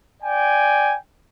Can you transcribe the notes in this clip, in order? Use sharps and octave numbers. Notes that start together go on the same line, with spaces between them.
D5 G5 G#5